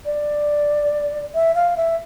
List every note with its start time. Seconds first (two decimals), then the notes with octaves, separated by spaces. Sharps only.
0.06 D5
1.35 E5
1.55 F5
1.77 E5